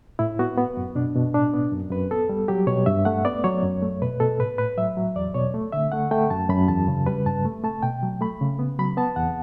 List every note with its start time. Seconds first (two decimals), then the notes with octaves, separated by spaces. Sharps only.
0.19 A2 E4
0.39 B3 F#4
0.58 B3
0.77 F#2
0.95 B2 D4
1.15 B2
1.33 A2 D4
1.53 B3
1.72 F#2
1.91 F#2 B4
2.11 B3 A4
2.29 G3
2.48 F#3 G4
2.67 B2 C#5
2.86 G2 E5
3.05 A3 F#5
3.25 B3 D5
3.44 F#3 C#5
3.63 F#2
3.82 A3
4.02 B2 B4
4.20 B2 A4
4.40 A2 B4
4.58 A2 B4
4.77 F#3 E5
4.97 F#3
5.15 E2 D5
5.34 B2 C#5
5.54 A3
5.73 D3 E5
5.92 A3 F#5
6.11 A3 G5
6.30 F#2 A5
6.49 F#2 B5
6.68 E2 A5
6.88 C#3
7.06 G3 B4
7.26 G2 A5
7.45 A3
7.63 A3 A5
7.82 B2 G5
8.03 F#3
8.21 A3 B5
8.41 C#3
8.59 B3
8.79 F#3 B5
8.97 B3 A5
9.16 E2 F#5